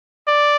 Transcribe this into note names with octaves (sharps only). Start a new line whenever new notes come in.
D5